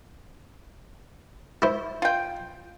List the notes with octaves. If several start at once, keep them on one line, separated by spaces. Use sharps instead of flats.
E4 C5
F4 G5